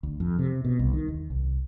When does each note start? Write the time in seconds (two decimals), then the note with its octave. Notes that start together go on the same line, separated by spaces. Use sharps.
0.03 D2
0.20 F2
0.39 C3
0.65 B2
0.79 C2
0.94 D#3
1.08 D#2
1.30 C2